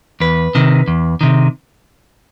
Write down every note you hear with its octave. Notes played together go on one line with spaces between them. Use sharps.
E2 B4
C3 D#3
E2
C3 D#3